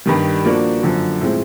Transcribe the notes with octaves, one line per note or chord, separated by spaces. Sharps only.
G2 D#3 G3
F3 A#3 D4 F#4
F#2 D3 F3
A2 F3 G#3 C4